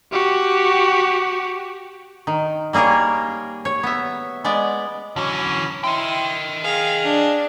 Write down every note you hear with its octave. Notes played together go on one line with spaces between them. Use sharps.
F#4 G4
D#3
G3 A#3 G#4 A#4 C#5
C#5
B3 E5
G#3 B3 D5
D3 E3 F#3 C#4
E4 D#5 G5 C6
G#4 F5
D4